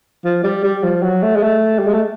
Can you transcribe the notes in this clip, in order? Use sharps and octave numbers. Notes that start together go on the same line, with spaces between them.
F3
G3
G3
F3
F#3
A3
G#3
A3
G3
G#3
A3